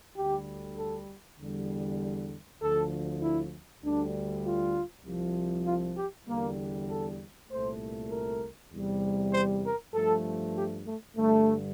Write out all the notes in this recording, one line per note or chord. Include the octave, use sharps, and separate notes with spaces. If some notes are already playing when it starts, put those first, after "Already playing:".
D2 D3 G3 G4
A4
E2 D3 G3
D2 D3 F3 A4
E4
D2 D3 G3 D4
F4
C2 C3 F3
F4
G4
E2 D3 G3 A#3
A4
C2 A#2 A3 C5
A#4
E2 C3 G3
C5
A#4
G2 F3 A3 A4
G4
A3
G2 D3 G3 A3